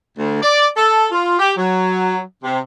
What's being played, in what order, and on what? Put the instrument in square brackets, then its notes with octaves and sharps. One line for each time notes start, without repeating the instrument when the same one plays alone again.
[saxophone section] D2
D5
A4
F4
G4
F#3
C3